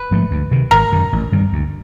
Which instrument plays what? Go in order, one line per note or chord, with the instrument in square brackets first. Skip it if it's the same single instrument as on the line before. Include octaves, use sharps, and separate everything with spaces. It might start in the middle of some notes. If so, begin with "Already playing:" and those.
Already playing: [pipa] B4
[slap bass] G#2 F3 A3
D2
C3 D#3
[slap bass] G#1 [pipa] A#4
[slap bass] F#2 D#3
A1
G2 D#3 G3
D2